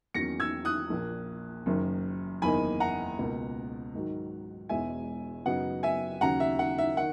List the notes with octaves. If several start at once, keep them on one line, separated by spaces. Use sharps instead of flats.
E2 D#3 F#3 A#3 C#4 A#6 C#7
E6 G#6
D#6 F#6
A#1 A#2 A#3
F#1 F#2 D#3
F#1 E2 D#3 A#3 D#4 G#5 B5
F#5 A#5
C#2 B2 A#3
G#2 D#3 F#3
E1 E2 B2 G#3 E5 G#5
F#2 C#3 F#3 B3 D#4 F#5
E5 G#5
D#2 C#3 F#3 C#4 F#5 A#5
E5
F#5
E5
D#3 F#5